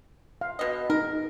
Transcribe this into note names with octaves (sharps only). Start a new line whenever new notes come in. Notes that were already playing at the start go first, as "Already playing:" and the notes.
F5
B2 D#5
D#4 A#4